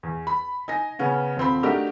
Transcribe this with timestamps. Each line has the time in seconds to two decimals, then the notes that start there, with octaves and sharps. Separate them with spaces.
0.03 E2
0.27 B5
0.68 D#4 G#5 A#6
0.99 C#3 B3 C#4
1.37 D#1 C4 B5
1.63 A3 D4 D#4 F#4 G4 A#4